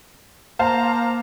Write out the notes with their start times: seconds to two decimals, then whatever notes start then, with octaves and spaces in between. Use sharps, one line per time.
0.59 A#3 C5 F5 A5 A#5